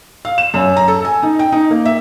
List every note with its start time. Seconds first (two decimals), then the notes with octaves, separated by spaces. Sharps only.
0.25 F5
0.38 E7
0.54 F#2
0.77 A#5
0.88 A4
1.05 G#5
1.23 D#4
1.39 G5
1.52 D#4
1.71 A#3
1.85 E5